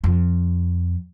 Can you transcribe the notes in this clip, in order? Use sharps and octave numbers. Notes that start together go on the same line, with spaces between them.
F2